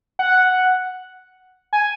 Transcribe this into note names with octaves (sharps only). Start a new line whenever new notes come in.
F#5
G#5